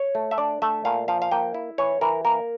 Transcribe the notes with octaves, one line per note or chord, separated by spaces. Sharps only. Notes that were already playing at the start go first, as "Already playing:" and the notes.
Already playing: C#5
A3
E5
D4 D5
A3 E5
A#2 F5
F3 F5
F5
A#3 G5
E4
E3 C#5
E3 A#4
A#3 A#4